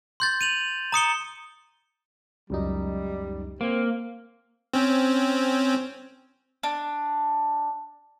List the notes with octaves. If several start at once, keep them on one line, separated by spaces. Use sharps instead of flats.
C6 G6 A6
D#7 F7 F#7
A#5 D#6 C#7 G7
C#2 F#2 G3 D#4
A#3 C4
C4 C#4
D4